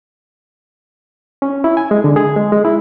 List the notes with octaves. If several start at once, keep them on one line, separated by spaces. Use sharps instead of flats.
C#4
E4
G#5
G#3
D3
G#4
G#3
G#3
E4